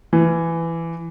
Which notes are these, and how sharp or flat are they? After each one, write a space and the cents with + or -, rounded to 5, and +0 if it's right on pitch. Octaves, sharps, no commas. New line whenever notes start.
E3 +15